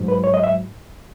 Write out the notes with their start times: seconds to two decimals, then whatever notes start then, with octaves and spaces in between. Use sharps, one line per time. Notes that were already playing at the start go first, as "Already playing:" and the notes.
Already playing: G#2 F#3
0.08 B4
0.24 C#5
0.34 D#5
0.44 E5